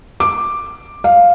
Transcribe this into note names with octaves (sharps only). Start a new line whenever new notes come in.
D6
F5